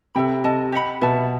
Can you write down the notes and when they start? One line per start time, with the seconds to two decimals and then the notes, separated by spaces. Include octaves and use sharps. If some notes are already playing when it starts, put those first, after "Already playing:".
0.15 C3 A4 E5 G5 B5
0.44 C3 A4 D#5 A5
0.72 G4 D#5 F#5 B5
1.01 B2 B4 E5 A5